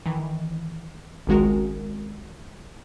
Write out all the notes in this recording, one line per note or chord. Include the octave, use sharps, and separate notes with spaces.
D#3 E3
G#1 C#2 D#3 G#3 F#4 A#4